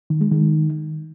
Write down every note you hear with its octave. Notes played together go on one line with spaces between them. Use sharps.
D#3
G#3
D#3